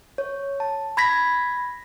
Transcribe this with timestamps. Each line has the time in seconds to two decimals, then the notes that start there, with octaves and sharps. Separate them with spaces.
0.18 C#5
0.60 A5
0.97 B5 G#6 A#6 B6